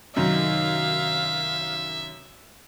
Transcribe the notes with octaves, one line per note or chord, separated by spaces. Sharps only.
F#2 C3 D#3 D#4 E5 F5